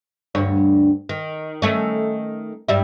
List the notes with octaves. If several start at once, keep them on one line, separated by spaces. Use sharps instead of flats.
D2 G2 C#5
D#3
D#3 A3 C#4
G2 G3 E4